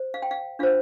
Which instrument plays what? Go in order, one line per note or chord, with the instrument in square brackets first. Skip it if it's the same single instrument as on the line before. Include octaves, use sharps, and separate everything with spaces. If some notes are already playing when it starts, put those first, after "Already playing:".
Already playing: [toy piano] C5
F5
G5
F5
D4 F4 C5 F5